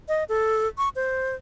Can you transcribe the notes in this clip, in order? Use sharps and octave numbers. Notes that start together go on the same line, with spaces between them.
D#5
A4
C#6
C5